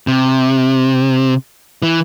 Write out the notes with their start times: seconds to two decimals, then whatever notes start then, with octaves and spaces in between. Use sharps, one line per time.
0.07 C3
1.83 E3